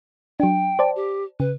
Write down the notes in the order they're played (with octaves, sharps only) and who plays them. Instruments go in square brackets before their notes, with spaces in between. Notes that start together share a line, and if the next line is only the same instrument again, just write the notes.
[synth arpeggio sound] F#3 D4 [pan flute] G5
[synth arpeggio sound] C5 D5 A5
[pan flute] G4
[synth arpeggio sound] C#3 [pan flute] B4